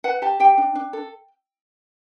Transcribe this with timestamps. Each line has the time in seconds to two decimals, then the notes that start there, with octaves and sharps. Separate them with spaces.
0.04 B4 F#5
0.22 G4 A5
0.40 G4 G5
0.58 D4
0.75 D4
0.93 A4